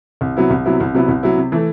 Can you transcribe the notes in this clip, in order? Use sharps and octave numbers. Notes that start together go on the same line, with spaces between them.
C2
C3 F#3 B3 E4
C2
C3 F#3 B3 E4
C2
C3 F#3 B3 E4
C2
C3 F#3 B3 E4
C3
E3 A3